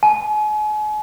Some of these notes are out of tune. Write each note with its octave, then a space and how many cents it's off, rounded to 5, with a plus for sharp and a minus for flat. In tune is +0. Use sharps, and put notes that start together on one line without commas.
G#5 +40